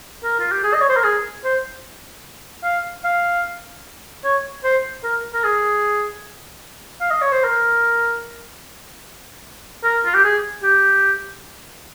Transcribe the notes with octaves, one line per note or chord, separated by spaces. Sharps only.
A#4
F4
G4
G#4
D#5
C#5
C5
A#4
G#4
C5
F5
F5
C#5
C5
A#4
A#4
G#4
F5
D#5
C#5
C5
A#4
A#4
F4
G4
G#4
G4